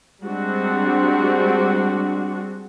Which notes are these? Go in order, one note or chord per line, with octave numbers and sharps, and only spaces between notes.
G3 G#3 C4 D4 F#4